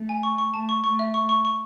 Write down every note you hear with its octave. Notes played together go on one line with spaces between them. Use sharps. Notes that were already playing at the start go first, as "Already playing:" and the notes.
Already playing: A3
G#5
C#6
C#6
A3 A5
C#6
A3 C#6
E5
C#6
C#6
C#6